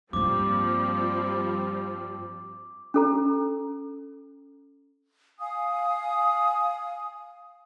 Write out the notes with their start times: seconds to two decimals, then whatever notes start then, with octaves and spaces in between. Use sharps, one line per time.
0.13 G2 F3 G3 A#3 C4 D6
2.94 C#4 A4 A#5
5.39 F5 G#5 D#6